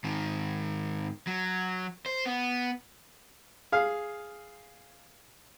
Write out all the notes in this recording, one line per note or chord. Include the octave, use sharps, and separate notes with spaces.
G#2 D#3
F#3
C5
B3
G#4 F5